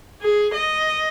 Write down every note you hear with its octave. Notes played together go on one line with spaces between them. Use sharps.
G#4
D#5